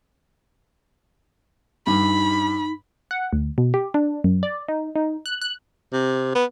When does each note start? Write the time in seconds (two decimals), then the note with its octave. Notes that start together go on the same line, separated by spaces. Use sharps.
1.87 G2 D#4 B5
3.11 F#5
3.33 D2
3.58 B2
3.74 G4
3.94 D4
4.24 F#2
4.43 D5
4.69 D#4
4.96 D#4
5.26 F#6
5.41 F#6
5.93 C3
6.35 B3